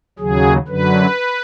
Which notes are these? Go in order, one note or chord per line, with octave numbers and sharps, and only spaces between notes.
D#2 C#3 F#3 G#4
F#2 D3 F#3 B4